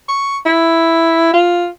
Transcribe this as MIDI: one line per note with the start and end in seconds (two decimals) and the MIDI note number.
0.09 0.37 85
0.46 1.32 64
1.34 1.67 65